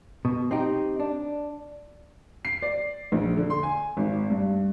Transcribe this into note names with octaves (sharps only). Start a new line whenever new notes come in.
B2
C4 D#4 G4
D4
C7
D5
A#1
D3
C6
G#5
G#1
G2